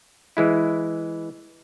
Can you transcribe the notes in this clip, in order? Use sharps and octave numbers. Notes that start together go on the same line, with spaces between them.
E3 G#3 E4